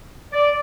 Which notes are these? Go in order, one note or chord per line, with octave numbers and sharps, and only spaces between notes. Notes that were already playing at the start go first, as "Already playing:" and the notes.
D5